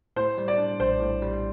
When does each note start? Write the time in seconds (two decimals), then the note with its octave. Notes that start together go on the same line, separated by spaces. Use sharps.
0.16 A2 C5
0.38 G3
0.48 D5
0.58 D4
0.80 A#1 C5
1.00 A2
1.22 G3